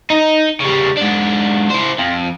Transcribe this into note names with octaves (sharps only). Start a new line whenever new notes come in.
D#4
C#3 G3
G#2 D4
E4 C5
F2